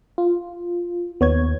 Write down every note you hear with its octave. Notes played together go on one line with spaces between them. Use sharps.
F4
D#2 B3 C#5 G#6